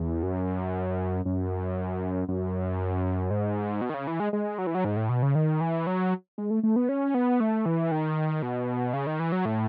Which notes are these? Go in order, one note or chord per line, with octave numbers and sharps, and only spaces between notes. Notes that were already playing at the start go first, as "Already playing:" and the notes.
Already playing: E2
F#2
F#2
F#2
G#2
B2
D#3
C#3
E3
G#3
G#3
F#3
E3
F#3
G#2
A2
B2
C#3
D#3
E3
F#3
G#3
A3
A3
B3
C#4
B3
A3
E3
D#3
B2
C#3
D#3
E3
F#3
A2